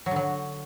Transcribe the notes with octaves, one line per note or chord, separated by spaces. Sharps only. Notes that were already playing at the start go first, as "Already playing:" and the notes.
F#3
D3
F#3